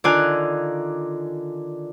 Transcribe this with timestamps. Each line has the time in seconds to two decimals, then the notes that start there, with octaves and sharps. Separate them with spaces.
0.04 D3 D#3 F4 D5 G#5 F#6